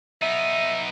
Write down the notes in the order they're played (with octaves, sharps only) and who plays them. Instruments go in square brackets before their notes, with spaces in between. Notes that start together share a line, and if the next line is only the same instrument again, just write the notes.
[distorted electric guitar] B3 D#4 [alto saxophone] E5